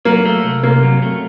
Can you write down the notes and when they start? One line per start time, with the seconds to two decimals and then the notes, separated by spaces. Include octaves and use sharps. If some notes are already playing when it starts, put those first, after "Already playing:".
0.05 F#3 A#3
0.25 A3
0.44 C2
0.63 C3 A#3
0.83 F#3
1.02 A3